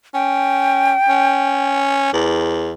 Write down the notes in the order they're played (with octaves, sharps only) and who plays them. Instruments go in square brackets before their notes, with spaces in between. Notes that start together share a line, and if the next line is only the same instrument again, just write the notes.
[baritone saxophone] C#4 [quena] G5
[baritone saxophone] C#4
E2